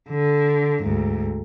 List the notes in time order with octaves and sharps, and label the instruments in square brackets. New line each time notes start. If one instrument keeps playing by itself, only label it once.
[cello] D3
D2 G#2